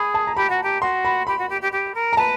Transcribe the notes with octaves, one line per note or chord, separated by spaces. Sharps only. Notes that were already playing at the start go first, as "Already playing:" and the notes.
Already playing: G#4 B5
A5
A#5
G4 B5
F#4
G4
F#4 C6
B5
G4 B5
F#4
G4
G4
G4
A#4
A#5
B4 A5